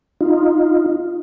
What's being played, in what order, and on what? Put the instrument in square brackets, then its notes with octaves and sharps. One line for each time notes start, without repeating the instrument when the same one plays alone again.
[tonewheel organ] D#4 F4